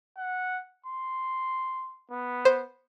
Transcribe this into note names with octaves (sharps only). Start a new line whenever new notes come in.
F#5
C6
B3
C5